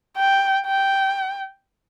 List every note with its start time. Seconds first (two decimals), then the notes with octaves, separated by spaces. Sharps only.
0.17 G5
0.66 G5